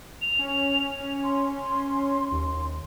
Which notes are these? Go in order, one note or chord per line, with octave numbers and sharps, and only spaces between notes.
F7
C#4
C6
D#2